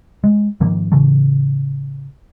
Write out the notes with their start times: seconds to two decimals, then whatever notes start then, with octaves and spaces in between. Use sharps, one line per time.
0.24 G#3
0.60 G#2 D#3 F3 A#3
0.92 A2 C#3 E3 A3